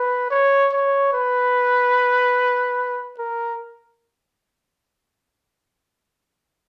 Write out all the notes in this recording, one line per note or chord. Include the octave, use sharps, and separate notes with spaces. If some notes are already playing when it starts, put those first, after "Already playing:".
Already playing: B4
C#5
C#5
B4
A#4